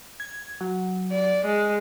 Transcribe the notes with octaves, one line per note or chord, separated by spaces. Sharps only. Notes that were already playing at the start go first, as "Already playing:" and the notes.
G#6
F#3
D5
G#3